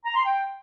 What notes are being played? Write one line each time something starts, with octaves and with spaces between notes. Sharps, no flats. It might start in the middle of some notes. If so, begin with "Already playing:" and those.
A#5
C6
G5